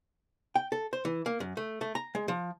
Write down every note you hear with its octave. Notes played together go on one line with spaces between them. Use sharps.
G5
A4
C5
E3
A#3
F#2
A3
A3
A#5
G#3
F3